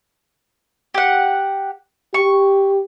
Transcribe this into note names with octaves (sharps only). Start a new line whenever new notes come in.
G4 F#5
G4 C#6